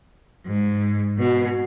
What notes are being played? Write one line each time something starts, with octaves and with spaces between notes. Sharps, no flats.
G#2
B2